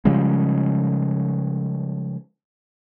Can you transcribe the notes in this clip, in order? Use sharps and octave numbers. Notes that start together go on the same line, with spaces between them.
C#3 F3 G3 G#3